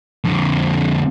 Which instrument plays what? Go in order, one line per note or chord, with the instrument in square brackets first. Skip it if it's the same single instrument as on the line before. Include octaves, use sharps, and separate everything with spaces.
[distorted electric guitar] F2 D3